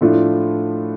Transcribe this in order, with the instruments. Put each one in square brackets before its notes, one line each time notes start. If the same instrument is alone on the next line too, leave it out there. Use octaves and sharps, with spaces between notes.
[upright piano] A2 F3 A3 D4 F4